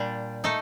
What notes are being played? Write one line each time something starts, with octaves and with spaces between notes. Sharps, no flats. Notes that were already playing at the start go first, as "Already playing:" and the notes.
Already playing: A#2 G3 D4
A3 D#4 A4